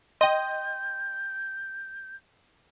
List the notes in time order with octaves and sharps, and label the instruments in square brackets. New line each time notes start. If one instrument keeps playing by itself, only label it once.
[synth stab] D#5 [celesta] G5 C6 [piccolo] G6